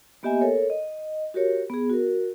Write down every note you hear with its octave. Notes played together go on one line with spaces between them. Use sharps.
A#3 B3 G4 D#5 E5 G#5
A4 A#4 C#5
D#5
F#4 G4 A#4 C#5
B3 G#4
F#4 A#4